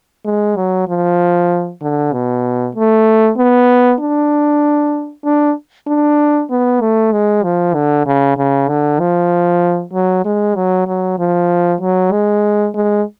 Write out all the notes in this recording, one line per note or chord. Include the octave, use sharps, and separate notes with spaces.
G#3
F#3
F3
D3
B2
A3
B3
D4
D4
D4
B3
A3
G#3
F3
D3
C#3
C#3
D3
F3
F#3
G#3
F#3
F#3
F3
F#3
G#3
G#3